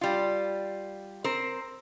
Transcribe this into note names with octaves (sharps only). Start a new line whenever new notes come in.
G3 F4
C4 A#4 C5